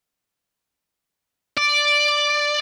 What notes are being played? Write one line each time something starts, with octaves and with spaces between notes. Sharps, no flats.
D5